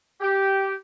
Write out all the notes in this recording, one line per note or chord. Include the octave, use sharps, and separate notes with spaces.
G4